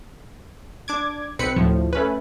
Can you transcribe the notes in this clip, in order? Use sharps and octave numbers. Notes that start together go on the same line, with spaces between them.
D4 D6 G#6
B1 C4 B4 B5 C#7
D2 A2 F3
A3 C#4 B4